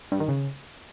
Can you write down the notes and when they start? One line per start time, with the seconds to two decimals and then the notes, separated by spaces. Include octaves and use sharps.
0.12 G2
0.20 D#3
0.28 C#3